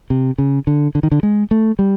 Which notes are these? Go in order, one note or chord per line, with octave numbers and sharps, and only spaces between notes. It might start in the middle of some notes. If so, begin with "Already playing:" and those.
C3
C#3
D3
D3
D#3
D3
G#3
A3
G3